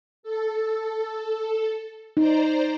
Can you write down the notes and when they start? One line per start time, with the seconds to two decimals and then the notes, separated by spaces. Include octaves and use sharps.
0.23 A4
2.17 D#4 C5 D5 A#5